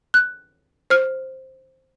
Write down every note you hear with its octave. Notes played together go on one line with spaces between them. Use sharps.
F#6
C5 F6